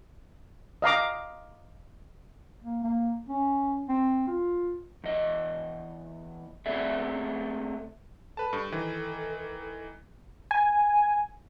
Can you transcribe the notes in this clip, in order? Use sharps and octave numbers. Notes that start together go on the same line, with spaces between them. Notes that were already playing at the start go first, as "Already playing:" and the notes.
D#5 F5 A#5 D6
A#3
A#3
C#4
C4
F4
E2 D#5
A3 B3 C4 G#4 D5 E5
A4 B4 A5
G2 A4
D#3 E3
G#5